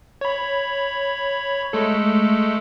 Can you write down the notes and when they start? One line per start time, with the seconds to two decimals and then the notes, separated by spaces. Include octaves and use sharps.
0.21 C#5 B5
1.73 G#3 A3 A4